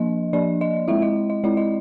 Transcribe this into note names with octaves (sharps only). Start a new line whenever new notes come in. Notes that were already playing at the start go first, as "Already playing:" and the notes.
Already playing: F3 A#3 D4 D#5
F3 A#3 D4 D5
D#5
G#3 C4 E4 E5
D#5
D#5
G#3 C4 E4 D5
D#5